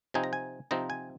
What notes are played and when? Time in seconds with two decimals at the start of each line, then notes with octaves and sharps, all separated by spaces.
0.14 C3 F3 C4 D#4 G#5
0.24 A#5
0.33 G#5
0.71 C3 F3 C4 D#4 A#5
0.90 G#5